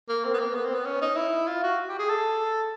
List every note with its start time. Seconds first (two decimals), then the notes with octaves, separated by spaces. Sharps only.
0.09 A#3
0.25 C4
0.34 B3
0.40 A#3
0.55 B3
0.65 C4
0.75 B3
0.87 C#4
1.02 D#4
1.17 E4
1.47 F4
1.64 F#4
1.89 G4
1.99 G#4
2.09 A4